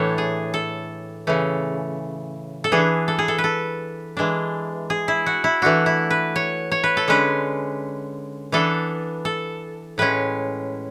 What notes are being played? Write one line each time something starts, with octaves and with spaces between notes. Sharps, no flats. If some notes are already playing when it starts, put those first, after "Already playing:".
Already playing: A2 E3 A3 D4 C#5
G#4
A4
C#3 E3 A3
A4
E3 B3 D4 G#4
A4
G#4
A4
B4
A4
E3 G#3 D4
G#4
E4
F#4
E4
E3 A3 D4 F#4
E4
B4
C#5
C#5
B4
A4
D3 G#3 C#4 B4
E3 B3 D4 A4
A4
A2 G#3 C#4 B4